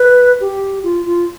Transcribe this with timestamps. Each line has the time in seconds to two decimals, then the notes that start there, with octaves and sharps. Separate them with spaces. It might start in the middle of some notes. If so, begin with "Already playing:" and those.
Already playing: B4
0.41 G4
0.83 F4
1.05 F4